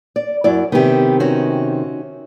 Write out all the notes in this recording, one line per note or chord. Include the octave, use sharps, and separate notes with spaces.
D5
F#2 E4 D5
C3 D#3 B3 G4
C#4 D#4 F#4